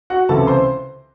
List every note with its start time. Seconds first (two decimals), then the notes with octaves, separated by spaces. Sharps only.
0.10 F#4 F#5
0.29 C#2 C3 E3 A4 A5
0.47 C5 C6